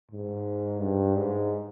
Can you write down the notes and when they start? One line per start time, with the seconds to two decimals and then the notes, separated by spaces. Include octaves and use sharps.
0.12 G#2
0.81 G2
1.16 G#2